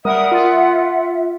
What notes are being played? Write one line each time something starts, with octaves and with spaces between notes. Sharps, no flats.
G3 A#4 E5 F#5 D#6
F4